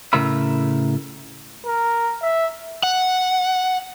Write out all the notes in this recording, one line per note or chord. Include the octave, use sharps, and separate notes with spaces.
A2 C#3 A#4 E5 B5
A#4
E5
F#5